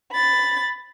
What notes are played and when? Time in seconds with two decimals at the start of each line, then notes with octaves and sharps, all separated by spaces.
0.12 B5 A6